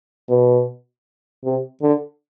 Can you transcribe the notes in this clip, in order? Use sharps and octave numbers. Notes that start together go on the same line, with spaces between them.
B2
C3
D3